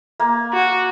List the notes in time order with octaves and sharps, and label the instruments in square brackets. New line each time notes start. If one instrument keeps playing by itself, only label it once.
[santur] A#3
[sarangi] F#4